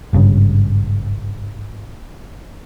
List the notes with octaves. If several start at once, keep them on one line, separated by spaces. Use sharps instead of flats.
G#1 G2 C#3